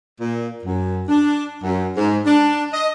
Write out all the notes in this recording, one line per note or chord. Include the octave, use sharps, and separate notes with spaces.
A#2
F#2
D4
F#2
G#2
D4
D#5